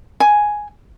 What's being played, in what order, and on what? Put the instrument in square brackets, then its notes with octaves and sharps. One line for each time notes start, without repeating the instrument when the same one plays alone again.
[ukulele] G#5